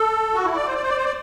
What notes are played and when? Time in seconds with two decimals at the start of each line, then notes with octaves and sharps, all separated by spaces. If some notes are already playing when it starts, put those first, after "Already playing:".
Already playing: A4
0.35 F#4
0.45 E4
0.56 D5
0.66 C5
0.74 D5
0.82 C5
0.89 D5
0.97 C5
1.05 D5